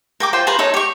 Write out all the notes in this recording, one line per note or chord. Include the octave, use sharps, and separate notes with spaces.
A#4 G5 D6
F4 C5 G5
A#4 B4 A#5 C6
D#4 A4 C#5
G4 C#6